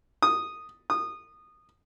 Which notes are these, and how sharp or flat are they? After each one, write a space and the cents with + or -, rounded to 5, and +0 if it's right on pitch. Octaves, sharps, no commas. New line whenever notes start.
D#6 -5
D#6 -20